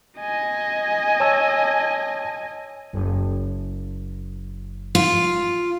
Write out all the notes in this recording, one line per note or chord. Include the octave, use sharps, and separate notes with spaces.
D#5 G#5
C#5 A5 E6
F#1
F4